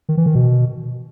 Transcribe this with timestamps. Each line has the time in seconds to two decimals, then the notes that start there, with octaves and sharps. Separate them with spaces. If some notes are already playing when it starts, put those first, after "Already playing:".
0.09 D#3
0.17 E3
0.26 D#3
0.35 B2